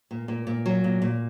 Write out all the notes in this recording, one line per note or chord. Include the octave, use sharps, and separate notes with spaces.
A#2
A#2
A#2
F#3
A#2
A#2